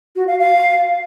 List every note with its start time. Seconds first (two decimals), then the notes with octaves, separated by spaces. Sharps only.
0.16 F#4
0.28 F5
0.39 F5